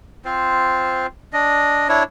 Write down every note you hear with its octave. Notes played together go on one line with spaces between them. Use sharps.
C4 F4 C5
D4 D#5
D4 E4 C#5